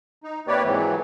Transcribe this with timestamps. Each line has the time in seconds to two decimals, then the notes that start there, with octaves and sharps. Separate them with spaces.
0.24 D#4
0.48 C3 A#3 G4 B4 C#5 D5
0.64 F2 G#2 E3 F#3